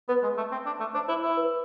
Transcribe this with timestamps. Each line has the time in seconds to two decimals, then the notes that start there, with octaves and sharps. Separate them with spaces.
0.09 B3 B4
0.23 G#3
0.37 A3
0.52 C4
0.66 D4
0.80 A3
0.94 D4 C5
1.09 E4 C5
1.23 E4 C5
1.37 B4